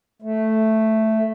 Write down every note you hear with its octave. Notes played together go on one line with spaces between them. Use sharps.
A3